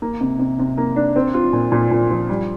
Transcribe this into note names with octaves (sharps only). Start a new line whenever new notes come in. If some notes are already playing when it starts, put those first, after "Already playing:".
A#3
C3
C3
C3
A#3
D4
C4
F4
A#2
A#2
A#2
F3
G3